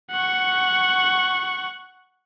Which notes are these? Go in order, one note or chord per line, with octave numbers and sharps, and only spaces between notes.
F#5 C#6